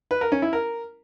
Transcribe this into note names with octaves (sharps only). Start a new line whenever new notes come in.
B4
A#4
C#4
E4
A#4